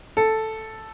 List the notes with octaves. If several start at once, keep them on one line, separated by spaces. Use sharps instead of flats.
A4